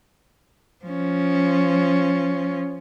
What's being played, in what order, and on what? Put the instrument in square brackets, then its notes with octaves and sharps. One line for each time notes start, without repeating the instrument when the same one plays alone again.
[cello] F3 C#4